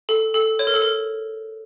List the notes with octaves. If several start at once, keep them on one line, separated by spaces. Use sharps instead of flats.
A4
A4
C#5
A#4
A4
A#4